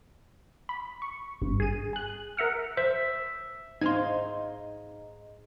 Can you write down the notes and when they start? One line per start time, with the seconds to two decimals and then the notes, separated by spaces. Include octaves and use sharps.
0.69 B5
1.02 C#6
1.41 G#1 G2
1.60 G#4 D#7
1.93 G#4 F#6
2.37 A#4 E5 F#5 F6
2.77 C5 E5
3.81 G#2 D#4 G#4 F5 C6 G#6